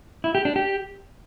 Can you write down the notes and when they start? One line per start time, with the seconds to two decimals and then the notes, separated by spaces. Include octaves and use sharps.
0.24 E4
0.35 G4
0.45 D4
0.56 G4